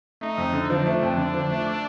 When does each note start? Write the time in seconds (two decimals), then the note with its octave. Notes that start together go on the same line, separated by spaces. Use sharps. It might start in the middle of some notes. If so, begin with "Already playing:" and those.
0.21 A3 D#4
0.38 F2
0.54 D3
0.70 F3 D4
0.86 A3
1.03 F2
1.18 D3
1.34 F3
1.51 A3